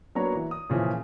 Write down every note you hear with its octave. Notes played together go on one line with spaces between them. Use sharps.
F#3 A#3 B3 D4 C#5 A#5
E3
D#6
A#2 C#3 E3 F3